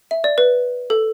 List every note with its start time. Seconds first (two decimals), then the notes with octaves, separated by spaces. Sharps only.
0.11 E5
0.24 D5
0.38 B4
0.90 A4